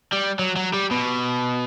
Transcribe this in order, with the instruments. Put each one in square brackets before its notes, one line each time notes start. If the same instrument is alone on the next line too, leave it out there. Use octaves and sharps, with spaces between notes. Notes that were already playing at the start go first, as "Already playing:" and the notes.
[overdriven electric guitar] G3
F#3
F#3
G3
B2